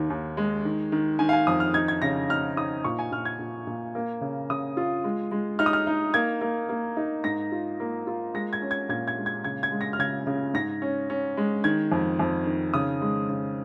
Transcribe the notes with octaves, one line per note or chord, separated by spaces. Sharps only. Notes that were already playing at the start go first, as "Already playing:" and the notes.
Already playing: D#2 D#3
D#2
G#3
D#3
D#3
D#3 G#5
F5
G#5
F2 D#6
F6
D#4 G#6
G#6
C#3 A#6
D#4 F6
D#4 D#6
A#2 C#6
G#5
A#2 F6
G#6
A#2
A#2
A#3
C#3
C#3 D#6
F4
G#3
G#3
D#4 F6
D#6
F6
D#4
A#3 G#6
A#3
A#3
D#4
G#2 A#6
F4
A#3
F4
G#3 A#6
G#6
C#4
G#6
A#2 G#6
G#6
G#3
G#6
C#3 G#6
G#6
G#3
A#6
F6
C#3 G#6
C#3
G#2 A#6
C#4
C#4
G#3
D#3 G#6
F2
F2
D#3
C#3 D#6
G#3
C#3